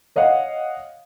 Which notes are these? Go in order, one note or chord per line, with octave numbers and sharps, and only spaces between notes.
C#5 D#5 F5 F#5